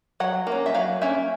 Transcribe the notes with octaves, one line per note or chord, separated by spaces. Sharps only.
F#3 F#5
A#3
C#4
E5
F#3 F5
A#3 C#4 E5